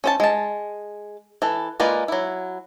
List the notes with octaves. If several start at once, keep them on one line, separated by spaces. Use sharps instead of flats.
C#4 C5 A5
G#3 A5
E3 A4
G#3 A#3 F4 B4 D5
F#3 E4